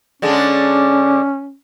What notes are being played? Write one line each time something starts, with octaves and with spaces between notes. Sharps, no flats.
D3 G#3 C#4 D4